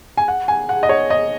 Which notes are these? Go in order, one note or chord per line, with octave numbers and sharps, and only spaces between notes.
G#5
F#5
G#5
F#5
D#5
C#5
D#5